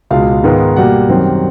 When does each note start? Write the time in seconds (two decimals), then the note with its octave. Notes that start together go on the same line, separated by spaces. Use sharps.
0.11 C#2 B2 G#3 F5
0.44 G#2 D#3 G#3 B3
0.76 B2 G3 A#3 F#5
1.09 F#2 D#3 G3 C4